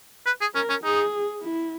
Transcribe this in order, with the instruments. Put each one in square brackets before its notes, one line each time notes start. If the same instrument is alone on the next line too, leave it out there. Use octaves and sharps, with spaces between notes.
[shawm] B4
G#4
[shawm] C#4 [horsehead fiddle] A#4
[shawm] C#4
[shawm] D#4 [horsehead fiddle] G#4
[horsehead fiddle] E4